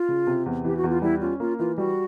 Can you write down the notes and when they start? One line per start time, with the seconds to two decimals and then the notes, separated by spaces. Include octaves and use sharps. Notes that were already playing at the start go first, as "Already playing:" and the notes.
Already playing: F4
0.08 C#3
0.27 C3
0.46 E2
0.64 E3 G4
0.77 F#4
0.84 E2
0.90 F4
1.02 G3 E4
1.21 C#4 F4
1.40 A#3 F4
1.59 E3 F4
1.78 G3 F#4